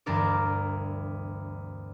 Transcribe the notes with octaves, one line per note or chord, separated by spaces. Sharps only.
E1 D2 G2 D4 A#4 D6